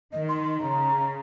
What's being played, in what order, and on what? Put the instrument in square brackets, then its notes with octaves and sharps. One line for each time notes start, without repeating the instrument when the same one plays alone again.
[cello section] D#3 [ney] D#5
[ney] C6
C6
[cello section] C#3 [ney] A#5